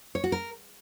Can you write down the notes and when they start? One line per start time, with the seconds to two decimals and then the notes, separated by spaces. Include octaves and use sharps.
0.15 C#5
0.24 F#4
0.32 A#4